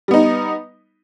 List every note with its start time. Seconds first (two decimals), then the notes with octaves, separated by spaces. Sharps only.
0.08 G3
0.11 B3
0.14 D#4